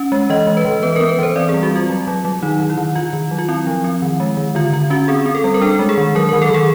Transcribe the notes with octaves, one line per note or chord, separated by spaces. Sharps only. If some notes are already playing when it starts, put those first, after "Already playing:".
Already playing: C#4
G#3
E3 D#5
G#3
B4
E3
B3 B4
B3 A#4
B4
E3 C5
C4 D5
G#4
G3
F#4
C4 F4
F#3
F#3
F#3
D#3 D#4
D#3
E4
D#3
D#3 F4
D#3
F#3
F4
C4 E4
F3
C4
D#3
G#3
D#3
D3 F4
D3 F4
C#4 F#4
C4 G#4
C4
A4
G3
A#4
D4 A4
G#3
G#4
D#3
F#3 A#4
D#3 A#4
A4
D#3 G#4